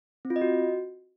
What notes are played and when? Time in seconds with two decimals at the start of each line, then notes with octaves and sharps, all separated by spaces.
0.25 C4
0.30 F4
0.36 D#5
0.41 F#4